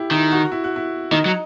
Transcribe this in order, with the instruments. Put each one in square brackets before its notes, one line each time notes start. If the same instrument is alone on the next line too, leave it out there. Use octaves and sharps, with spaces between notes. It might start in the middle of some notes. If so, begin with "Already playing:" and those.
Already playing: [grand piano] E4 G4
[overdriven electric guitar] D#3 [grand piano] E4
[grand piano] F#4
E4
F#4
E4
[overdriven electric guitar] D#3 [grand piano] D#4
[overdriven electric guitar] F#3